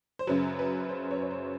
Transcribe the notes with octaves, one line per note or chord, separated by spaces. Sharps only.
C5
F#2 C#3 F#3 B4
B4
C5
C#5
C#5
C5